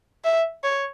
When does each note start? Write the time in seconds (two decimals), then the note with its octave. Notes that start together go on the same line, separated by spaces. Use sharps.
0.24 E5
0.64 C#5